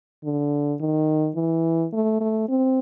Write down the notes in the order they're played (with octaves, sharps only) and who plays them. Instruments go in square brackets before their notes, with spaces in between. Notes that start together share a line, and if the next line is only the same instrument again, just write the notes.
[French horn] D3
D#3
E3
A3
A3
C4